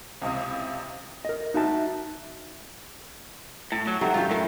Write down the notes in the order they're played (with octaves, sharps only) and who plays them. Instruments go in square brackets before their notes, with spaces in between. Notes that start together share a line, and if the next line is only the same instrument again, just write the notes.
[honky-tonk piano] C#2 C3 E4 D#6
[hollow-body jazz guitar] A#4 D#5
D#4 F#4 E5 A5
[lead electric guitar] A2 [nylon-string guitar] A5
[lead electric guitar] F#3
[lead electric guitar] G#2 [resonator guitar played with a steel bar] F#3 [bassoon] A3 [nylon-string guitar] G4
[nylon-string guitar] F#2 D#3 F#3 [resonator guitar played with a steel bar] F4 G4
[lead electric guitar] A2 [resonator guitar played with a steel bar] A#4